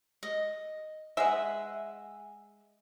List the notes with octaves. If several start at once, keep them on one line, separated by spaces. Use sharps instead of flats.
D#5
G#3 G#4 E5 F#5